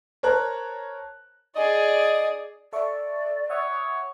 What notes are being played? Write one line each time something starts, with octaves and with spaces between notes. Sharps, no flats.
A#4 C5 C#5 A5 A#5 F#6
G#4 D5 D#5
A4 D5 E5 C#6
C#5 E5 F#5 D#6